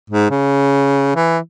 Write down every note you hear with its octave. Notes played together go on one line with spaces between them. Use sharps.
G#2
C#3
E3